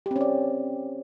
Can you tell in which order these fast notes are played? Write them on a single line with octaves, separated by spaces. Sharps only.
G4 C4 C#4 D5